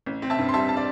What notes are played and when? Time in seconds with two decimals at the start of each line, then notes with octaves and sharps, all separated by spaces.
0.06 A1
0.22 C4
0.30 E5 A5
0.38 G2
0.49 C6
0.54 G3 E5 A5
0.69 A5
0.77 D5